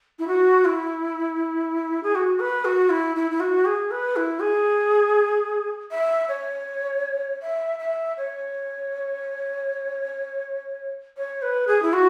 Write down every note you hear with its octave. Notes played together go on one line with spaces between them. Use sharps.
E4
F#4
E4
G#4
F#4
B4
F#4
E4
E4
E4
F#4
G#4
B4
E4
G#4
E5
C#5
E5
E5
C#5
C#5
B4
G#4
E4
F#4